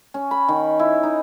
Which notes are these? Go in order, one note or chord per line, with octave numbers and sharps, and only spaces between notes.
C#4
B5
D#3
E4
D#4